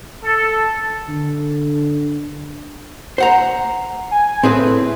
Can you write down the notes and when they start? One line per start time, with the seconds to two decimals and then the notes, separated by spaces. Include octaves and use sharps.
0.23 A4
1.09 D3
3.18 C5 F#5 A#5
4.11 G#5
4.43 A2 C4 G#4 B4